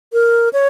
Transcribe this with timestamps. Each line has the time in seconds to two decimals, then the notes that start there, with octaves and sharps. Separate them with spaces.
0.13 A#4
0.53 C#5